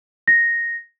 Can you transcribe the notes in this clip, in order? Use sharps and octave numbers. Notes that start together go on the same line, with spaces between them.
A#6